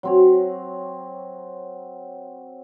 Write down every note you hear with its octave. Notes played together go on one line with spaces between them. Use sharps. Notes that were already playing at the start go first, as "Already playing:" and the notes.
F#3 C4 C#5